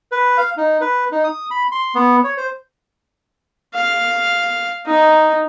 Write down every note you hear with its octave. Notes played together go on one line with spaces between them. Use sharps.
B4
F5
D#4
B4
D#4
D#6
B5
C6
B3
C#5
C5
F5
D#4